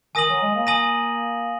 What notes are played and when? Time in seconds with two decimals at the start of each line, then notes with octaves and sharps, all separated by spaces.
0.15 D#3 G#5 D#6 A#6 D#7 F#7
0.29 F#3
0.42 G#3
0.55 A#3
0.67 G#5 D#6 A#6 D#7 F#7